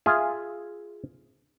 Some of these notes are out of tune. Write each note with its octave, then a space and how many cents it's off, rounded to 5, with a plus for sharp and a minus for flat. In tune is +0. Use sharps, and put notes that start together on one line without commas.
F4 +0 G#4 +0 E5 +0